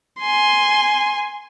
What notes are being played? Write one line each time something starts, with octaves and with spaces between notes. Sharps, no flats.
G#5 C6